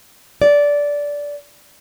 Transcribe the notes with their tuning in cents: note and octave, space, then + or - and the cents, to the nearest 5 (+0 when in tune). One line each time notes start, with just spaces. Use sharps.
D5 -15